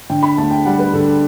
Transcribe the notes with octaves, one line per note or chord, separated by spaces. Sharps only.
D3 G5
B5
D2 A5
G5
G3 F#5
B4
D3 A4
G4